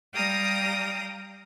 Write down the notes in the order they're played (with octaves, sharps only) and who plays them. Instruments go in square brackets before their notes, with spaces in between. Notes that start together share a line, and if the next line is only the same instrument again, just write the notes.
[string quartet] G3 F5 G5 A#5 D#6 A#6